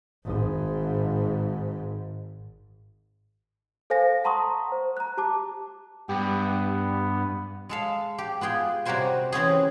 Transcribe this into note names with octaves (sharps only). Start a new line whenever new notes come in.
G#1 G#2
A4 C5 F5 G#5 A#6
F#5 A5 A#5 C6 C#6 D#6
C5
A#5 F#6
G4 A5 D6
G2 B3 G4
G#3 A4 F5
G4
B3 F4 G#4 G5
C3 G3 F#4 A#4 C5 G#5
E3 C4 C#4 G#4